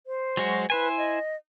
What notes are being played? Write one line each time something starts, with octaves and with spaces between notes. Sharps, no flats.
C5
F#3 G#3 F#4
E4 B4 C5 G#5
D#5